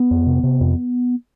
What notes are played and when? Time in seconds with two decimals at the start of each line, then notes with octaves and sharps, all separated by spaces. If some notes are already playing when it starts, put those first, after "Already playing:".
Already playing: B3
0.11 F2
0.27 C3
0.43 C3
0.61 F2